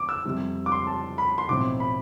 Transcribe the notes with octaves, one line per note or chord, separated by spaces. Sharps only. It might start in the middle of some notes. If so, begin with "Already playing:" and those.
Already playing: F2 D6
E6
F2 C3 G3
D6
C6
A5
B5
C6
B1 A2 F3 C4 D6
B5